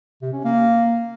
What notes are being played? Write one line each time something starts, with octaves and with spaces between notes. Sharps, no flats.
C3
C#4
A#3